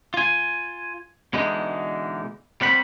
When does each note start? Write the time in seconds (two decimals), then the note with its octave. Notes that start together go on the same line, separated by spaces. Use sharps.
0.14 F4 G#5
1.33 B2 D3 E3 G#3 D#4
2.61 G3 C4 F#5 B5